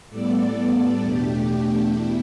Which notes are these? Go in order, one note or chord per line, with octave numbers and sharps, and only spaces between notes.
A2 G3 B3 A4 D5
E2 B2 A3 D4 G4
B2 E4